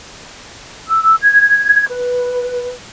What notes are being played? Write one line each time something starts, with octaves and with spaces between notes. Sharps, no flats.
E6
G#6
B4